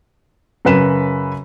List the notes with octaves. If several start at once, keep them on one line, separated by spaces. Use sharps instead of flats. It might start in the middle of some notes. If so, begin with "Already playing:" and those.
F#2 C#3 B4 B5 E7